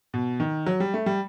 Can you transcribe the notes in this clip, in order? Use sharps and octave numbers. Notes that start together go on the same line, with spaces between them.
B2
D#3
F#3
G3
A3
G3